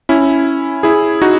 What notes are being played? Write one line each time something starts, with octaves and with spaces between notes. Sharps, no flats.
C#4 E4
E4 G#4
D#4 F#4